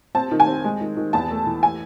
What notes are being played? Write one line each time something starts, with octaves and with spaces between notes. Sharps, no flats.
C4 A5
D#3
G#5
C4
G#3
D#3
D#3
E2 A5
A3
E3
G#5